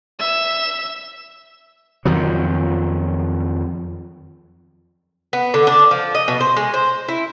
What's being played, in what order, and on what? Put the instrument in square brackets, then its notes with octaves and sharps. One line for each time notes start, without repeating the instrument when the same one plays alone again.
[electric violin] E5 [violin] E7
[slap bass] F2 D#3 F3 F#3
[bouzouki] B3
D3
D4
F3
D#5
B2
C5
G#3
C5
E4